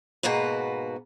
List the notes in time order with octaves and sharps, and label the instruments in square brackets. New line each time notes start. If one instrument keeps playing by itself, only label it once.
[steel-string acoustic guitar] G#2 B2 A#3 F#4 B4